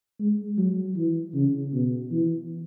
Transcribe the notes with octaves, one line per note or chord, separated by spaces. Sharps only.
G#3
F#3
E3
C#3
B2
E3